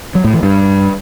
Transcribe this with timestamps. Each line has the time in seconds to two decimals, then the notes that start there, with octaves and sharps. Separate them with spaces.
0.15 F#3
0.24 A2
0.34 E3
0.43 G2